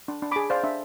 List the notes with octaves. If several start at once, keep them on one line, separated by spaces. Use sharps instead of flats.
D4
D4
G#4 B5 D6
C5 D5 F5
D4 E5